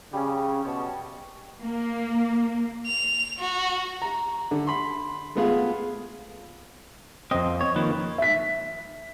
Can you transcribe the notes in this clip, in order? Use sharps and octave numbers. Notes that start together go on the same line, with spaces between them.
C#3 G3 C#4
B2 C#5 A5 C#6
A#3
F7
F#4
A#5
D3
B5 C6
G#3 A3 B3 F4 G#4
F2 C4 C5 D#5 G5
C#5
D#3 F3 A#3 B4
E5 B6